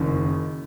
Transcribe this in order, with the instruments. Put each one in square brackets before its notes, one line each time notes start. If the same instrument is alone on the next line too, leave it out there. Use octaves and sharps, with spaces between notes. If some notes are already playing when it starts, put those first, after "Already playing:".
Already playing: [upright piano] F#1 F#2 D#3